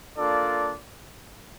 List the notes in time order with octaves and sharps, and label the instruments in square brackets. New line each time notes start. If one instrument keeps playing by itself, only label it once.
[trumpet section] A#3 D4 F4 A4 D5